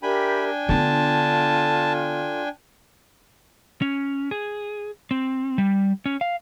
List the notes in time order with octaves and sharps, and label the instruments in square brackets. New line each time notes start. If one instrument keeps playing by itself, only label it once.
[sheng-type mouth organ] D4 G5 G#5 [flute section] G4 A#4 E5 [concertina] B5
[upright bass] D3 B3 [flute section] F4 A4 [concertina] A5
[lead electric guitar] C#4
G#4
C4
G3
C#4
F5